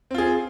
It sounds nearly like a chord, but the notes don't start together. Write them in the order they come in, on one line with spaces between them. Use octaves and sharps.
C4 F4 G#4